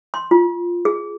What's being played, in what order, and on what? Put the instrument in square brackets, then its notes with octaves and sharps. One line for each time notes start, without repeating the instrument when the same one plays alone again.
[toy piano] C6
F4
G#4